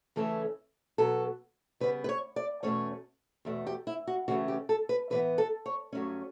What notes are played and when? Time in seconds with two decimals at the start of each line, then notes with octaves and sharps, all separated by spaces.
0.16 C#3 E3 A3 C#4 A4
0.98 B2 F#3 B3 A4
1.80 C#3 G3 B3 B4
2.04 B4
2.09 C#5
2.36 D5
2.63 E2 B2 A3 C#4 C#5
3.45 E2 B2 A3
3.67 G4
3.87 E4
4.07 F#4
4.28 C#3 E3 A3 C#4 F#4
4.48 G4
4.69 A4
4.89 B4
5.10 A2 E3 B3 B4
5.38 A4
5.66 C#5
5.92 G2 F#3 A3 C#4